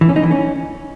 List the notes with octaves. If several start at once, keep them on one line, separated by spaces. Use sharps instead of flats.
E3
C#4
D#4
E3
C#4